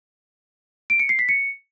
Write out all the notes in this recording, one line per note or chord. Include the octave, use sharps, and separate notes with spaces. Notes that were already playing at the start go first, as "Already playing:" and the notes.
D7
C#7
C7
B6
C#7